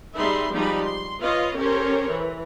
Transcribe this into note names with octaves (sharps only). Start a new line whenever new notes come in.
G3 D#4 G#4 E5 B5 C6
F3 G3 G#3 D#4 G4 B5
C6
F4 B4 C#5 D#5 F5
C#4 G4 A4 A#4 C5 C#5
E3